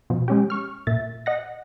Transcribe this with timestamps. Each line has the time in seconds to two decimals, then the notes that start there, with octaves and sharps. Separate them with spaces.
0.10 B2 F3
0.28 G#3 C#4 G4
0.50 C#6 F6
0.87 A#2 E5 A6
1.26 D#5 F#5 A#6